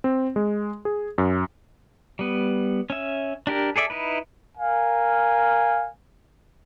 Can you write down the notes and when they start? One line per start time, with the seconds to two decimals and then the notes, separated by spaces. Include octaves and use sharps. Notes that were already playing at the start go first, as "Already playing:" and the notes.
0.04 C4
0.36 G#3
0.85 G#4
1.18 F#2
2.19 G3 B3
2.90 C#4 E5
3.47 D4 G4 A#4
3.76 G#4 A4 D5 E5
3.90 D#4 E4 B4
4.57 A#4 F5 G#5